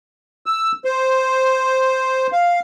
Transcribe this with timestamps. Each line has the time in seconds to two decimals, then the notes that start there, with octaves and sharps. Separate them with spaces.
0.46 E6
0.85 C5
2.32 F5